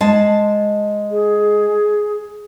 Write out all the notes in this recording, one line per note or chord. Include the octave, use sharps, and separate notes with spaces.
G#3 A5
G#4